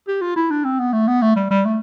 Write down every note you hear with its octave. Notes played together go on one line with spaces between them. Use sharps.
G4
F4
E4
D4
C4
B3
A3
B3
A3
G3
G3
A3